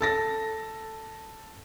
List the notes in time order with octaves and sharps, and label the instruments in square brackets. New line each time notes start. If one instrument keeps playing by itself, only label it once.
[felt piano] A4 A6 A#6